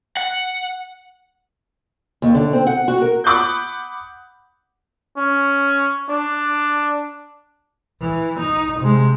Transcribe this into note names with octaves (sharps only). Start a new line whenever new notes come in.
F#5
D#2
D3
C4
F#5
F#4
A#4
F#5 B5 D6 D#6 F#6 G6
C#4
D4
E3
D#4
C3 G#3